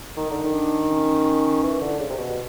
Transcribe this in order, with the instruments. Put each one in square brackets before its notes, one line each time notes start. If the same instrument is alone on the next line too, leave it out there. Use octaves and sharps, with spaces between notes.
[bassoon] D#3 [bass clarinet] D#4
[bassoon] D3
D#3
[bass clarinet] D4
C#4
[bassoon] E3
D3
C#3
C3
B2